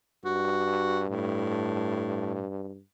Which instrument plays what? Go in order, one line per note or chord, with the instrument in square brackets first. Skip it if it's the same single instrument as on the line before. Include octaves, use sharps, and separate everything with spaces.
[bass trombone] G2 [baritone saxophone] F#4
[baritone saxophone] A2